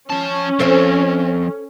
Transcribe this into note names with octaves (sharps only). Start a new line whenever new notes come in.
F3 C#4 A5
F3 C4 A4 C5 E5